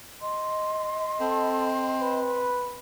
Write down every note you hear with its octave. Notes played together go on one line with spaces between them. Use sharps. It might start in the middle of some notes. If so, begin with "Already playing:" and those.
D#5 C6
C4 A4
B4